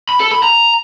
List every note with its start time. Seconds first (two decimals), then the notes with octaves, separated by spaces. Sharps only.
0.09 B5
0.20 A4
0.32 B5
0.43 A#5